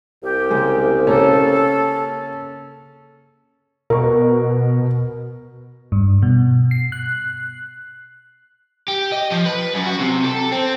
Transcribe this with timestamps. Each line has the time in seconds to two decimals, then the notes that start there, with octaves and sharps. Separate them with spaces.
0.23 C2 G4
0.50 C#3 G#3 A#3
1.07 C#3 A#3 C#4 A4 A#4
3.90 B2 A#4 C#6
5.92 G2
6.22 B2
6.71 C7
6.92 F#6
8.88 G4
9.12 D#5
9.31 F3
9.45 B4
9.74 F#2
9.86 F#4
9.99 C3
10.24 A4
10.52 C4